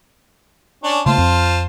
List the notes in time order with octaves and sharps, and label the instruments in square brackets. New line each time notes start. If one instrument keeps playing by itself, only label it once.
[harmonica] C#4 D4
[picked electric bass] C#3 A3 A#3 [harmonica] F4 C5 A5
[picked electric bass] F2 C4